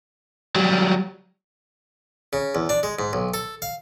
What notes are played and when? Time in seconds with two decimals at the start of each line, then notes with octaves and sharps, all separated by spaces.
0.55 F#3 G3
2.33 C#3
2.55 E2
2.69 D4
2.83 G#3
2.99 G#2
3.13 B1
3.34 A4
3.62 F5